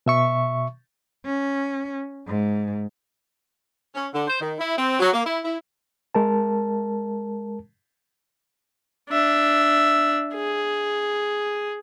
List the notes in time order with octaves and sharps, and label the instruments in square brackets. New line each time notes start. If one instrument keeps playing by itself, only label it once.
[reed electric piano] B2 E5 C#6
[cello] C#4
G#2
[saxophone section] C#4
D3
C5
D#3
E4
C4
F#3
A#3
E4
E4
[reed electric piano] G#3 A#4 A5
[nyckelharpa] D4 E5
G#4